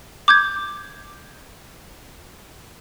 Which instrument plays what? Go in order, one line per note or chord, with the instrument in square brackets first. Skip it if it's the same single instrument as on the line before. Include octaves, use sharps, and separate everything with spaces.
[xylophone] D6 G6 G#6